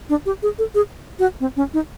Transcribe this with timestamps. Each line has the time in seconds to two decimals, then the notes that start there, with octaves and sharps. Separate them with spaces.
0.09 D4
0.26 G4
0.43 G#4
0.59 A4
0.75 G#4
1.19 F#4
1.40 C4
1.56 C#4
1.74 D#4